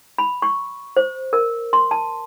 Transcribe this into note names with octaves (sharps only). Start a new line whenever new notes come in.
B5
C#6
C5
A#4
C6
A5